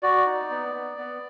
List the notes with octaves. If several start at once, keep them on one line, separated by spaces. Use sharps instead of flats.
F#4 D5
D#4
B3
B3
B3